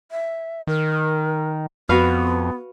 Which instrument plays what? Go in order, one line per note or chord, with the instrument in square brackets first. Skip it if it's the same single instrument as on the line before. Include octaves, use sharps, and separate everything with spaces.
[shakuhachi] E5
[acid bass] D#3 [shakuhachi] A#4
[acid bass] F2 [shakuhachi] B3 [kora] F#4 B4 F5